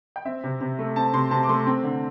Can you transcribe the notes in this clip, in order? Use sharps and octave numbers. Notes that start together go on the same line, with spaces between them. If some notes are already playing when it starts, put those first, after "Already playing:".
G5
C4 E5
C3
C3
A3
C4 A5
C3 C6
C3 A5
D6
A3 C6
C4
D3